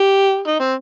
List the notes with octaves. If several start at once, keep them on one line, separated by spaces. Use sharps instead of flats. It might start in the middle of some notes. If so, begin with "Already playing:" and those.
Already playing: G4
D#4
C4